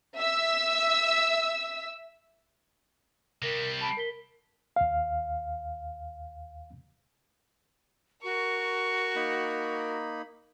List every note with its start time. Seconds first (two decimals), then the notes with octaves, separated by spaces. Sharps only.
0.20 E5 E6
3.42 C3 G3 A#4 A#6
3.81 A5 B5 D7
3.97 A#4 B6 G7
4.76 D#2 F5
8.24 F#4 A#4 C#6
9.16 A#3 D#4 B5